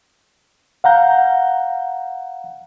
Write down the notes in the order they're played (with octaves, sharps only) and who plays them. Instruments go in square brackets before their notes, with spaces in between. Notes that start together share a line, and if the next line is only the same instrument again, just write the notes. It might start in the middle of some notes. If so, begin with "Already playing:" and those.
[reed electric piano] F5 F#5 A#5 G6